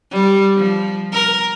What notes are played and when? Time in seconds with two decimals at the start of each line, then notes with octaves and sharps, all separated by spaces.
0.11 G3
0.57 F3
1.12 A#4